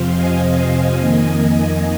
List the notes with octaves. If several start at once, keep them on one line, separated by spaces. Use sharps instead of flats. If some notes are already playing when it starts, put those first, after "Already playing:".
Already playing: F2 C3 F3 C4 C5 F5
D#5 G#5
F2 D#3 A#3